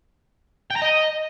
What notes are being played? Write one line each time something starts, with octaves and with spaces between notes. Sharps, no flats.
G5
A#5
D#5